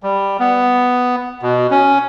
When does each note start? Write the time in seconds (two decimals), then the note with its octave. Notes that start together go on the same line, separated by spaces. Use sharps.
0.03 G3
0.40 B3
1.42 B2
1.71 C#4